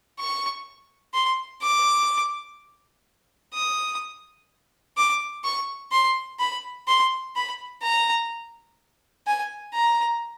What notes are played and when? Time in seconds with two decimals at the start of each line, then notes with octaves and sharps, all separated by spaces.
0.19 C#6
1.14 C6
1.62 D6
3.54 D#6
4.97 D6
5.44 C#6
5.92 C6
6.39 B5
6.88 C6
7.36 B5
7.83 A#5
9.27 G#5
9.74 A#5